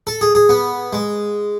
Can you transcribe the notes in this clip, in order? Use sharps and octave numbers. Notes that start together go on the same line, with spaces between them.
A4
G#4
G#4
B3
G#3